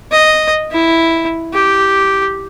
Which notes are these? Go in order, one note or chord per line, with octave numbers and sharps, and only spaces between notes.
D#5
E4
G4